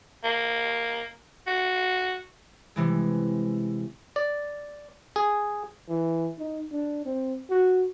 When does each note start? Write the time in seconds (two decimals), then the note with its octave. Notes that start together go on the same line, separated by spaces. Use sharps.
0.24 A#3
1.47 F#4
2.76 C3 E3 G#3
4.16 D5
5.16 G#4
5.89 E3
6.39 D#4
6.73 D4
7.06 C4
7.50 F#4